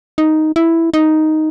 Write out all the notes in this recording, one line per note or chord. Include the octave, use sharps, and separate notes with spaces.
D#4
E4
D#4